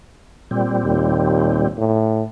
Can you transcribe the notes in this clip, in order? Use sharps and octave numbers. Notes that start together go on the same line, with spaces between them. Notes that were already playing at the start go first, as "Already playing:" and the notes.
A#2 G3 C4
D#2
A2